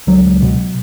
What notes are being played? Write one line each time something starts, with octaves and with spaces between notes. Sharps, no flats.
C#2 F#3
C#2
B2